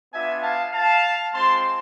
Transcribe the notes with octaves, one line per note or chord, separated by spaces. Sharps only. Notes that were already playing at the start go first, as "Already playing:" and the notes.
B3 D4 F4 E5 G#5
F5 A5
F5 A5
G#3 C4 F4 A5 C6